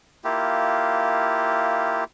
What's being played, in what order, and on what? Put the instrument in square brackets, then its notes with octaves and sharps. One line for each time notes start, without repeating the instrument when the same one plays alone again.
[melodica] A#3 E4 F4 G4